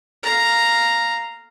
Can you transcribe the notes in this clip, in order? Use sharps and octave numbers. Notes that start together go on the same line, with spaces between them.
F5 A#5